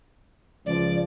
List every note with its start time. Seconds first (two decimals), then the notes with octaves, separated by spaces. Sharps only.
0.66 C#2 F3 D5